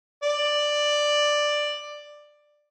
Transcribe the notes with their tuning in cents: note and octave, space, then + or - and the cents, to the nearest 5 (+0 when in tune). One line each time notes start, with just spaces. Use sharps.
D5 +10